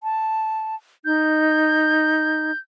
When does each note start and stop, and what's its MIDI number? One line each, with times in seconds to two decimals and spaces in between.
0.03 0.75 81
1.05 2.51 63
1.05 2.58 91